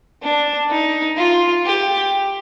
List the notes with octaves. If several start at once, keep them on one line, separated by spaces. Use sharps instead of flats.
D4
D#4
F4
G4